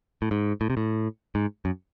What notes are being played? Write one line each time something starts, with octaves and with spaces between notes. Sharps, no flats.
A2
G#2
A2
C3
A2
G#2
F#2